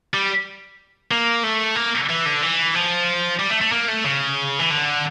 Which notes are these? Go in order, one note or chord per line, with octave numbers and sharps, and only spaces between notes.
G3
A#3
A3
A#3
E3
D3
E3
F3
G3
A3
A3
A#3
A3
C#3
E3
D3